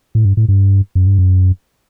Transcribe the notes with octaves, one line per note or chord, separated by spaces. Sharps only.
A2
G2
A2
G2
F#2
G2
F#2